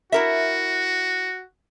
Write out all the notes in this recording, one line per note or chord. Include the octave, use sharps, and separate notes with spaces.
E4 F#4 A#4 E5